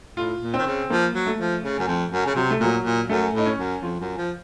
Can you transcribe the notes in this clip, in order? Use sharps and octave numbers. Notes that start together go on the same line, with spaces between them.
A2 F4
A#2
C4
D#3
C#3
F3 A#3
F#3
A3
F3
C#3
F#2
F2
F#2
C#3
C3 F#3
A3
A#2 F#3
A#2
F#2 A3
A2 D#4
C#4
F#2
F2 F4
F#2
F3